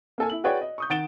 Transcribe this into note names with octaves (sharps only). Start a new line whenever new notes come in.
A#3 A4 G#5
E4 F#7
F#4 G#4 B4 C#5 D5 G5
D#5
C#6 D#6 G6
D#3 F#5 A6 D7 E7 G7